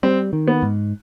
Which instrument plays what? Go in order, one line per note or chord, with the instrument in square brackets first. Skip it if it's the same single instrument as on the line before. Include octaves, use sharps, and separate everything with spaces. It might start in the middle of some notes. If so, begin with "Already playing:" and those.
[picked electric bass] G3 [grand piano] C4
[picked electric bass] D#3
[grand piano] B3
[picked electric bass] G#2